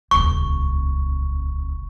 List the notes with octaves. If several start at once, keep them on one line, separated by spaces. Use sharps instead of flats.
D#1 C#2 C#6